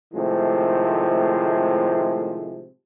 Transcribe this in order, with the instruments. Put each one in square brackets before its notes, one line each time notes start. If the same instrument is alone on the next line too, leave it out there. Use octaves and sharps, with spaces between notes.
[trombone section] A2 C3 D#3 F3 G#3 A3